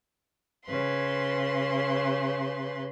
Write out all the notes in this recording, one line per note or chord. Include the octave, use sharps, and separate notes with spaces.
C#3 B4 C6